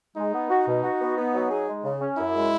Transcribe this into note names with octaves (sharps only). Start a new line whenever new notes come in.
G#3 D#4
B3
F#4
B2
F#4
B3
B3
F#3
G#4
G#3
C#3
C#4
F#2 E4
G#3